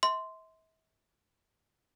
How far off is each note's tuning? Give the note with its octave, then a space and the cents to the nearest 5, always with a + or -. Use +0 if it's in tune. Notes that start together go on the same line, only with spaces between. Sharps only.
E5 -40 C6 -10